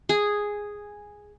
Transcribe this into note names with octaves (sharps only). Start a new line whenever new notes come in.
G#4